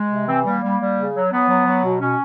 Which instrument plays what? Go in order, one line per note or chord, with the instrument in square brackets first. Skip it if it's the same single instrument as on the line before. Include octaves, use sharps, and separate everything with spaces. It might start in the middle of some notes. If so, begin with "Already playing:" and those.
Already playing: [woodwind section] G#3
C3
E3 C4
G3 A#3
G3
G3
C#3
F#3
F#3 B3
F#3
F#3
B2
B2 C#4